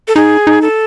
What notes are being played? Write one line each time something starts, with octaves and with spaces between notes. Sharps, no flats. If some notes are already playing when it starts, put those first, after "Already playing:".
A4
D#4 G#4
D#4
A4